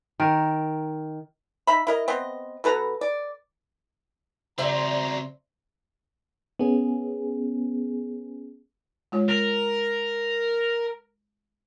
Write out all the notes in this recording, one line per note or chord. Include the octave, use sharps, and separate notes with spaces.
D#3 A#4
D#4 E5 B5
E4 A#4 D#5
B3 C4 D#5
B2 A4 B4 A#5
D5
C#3 F#3 G3 C4 C5 D5 E5 A#5
B3 C#4 G#4
G#3 F4 C#5
A#4